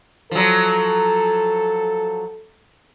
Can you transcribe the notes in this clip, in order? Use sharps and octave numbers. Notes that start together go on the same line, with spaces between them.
F3 F#3 A4